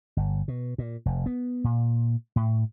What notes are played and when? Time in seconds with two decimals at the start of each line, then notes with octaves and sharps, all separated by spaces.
0.17 G1
0.48 B2
0.78 A#2
1.06 F1
1.26 B3
1.64 A#2
2.36 A2